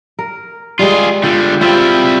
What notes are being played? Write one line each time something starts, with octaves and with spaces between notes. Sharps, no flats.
A#4
G3 G#3 F4 G#4
D3 G3 F4
G3 C4 E4 F4